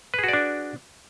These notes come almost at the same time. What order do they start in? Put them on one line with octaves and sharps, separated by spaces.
B4 G#4 F#4 D5 D4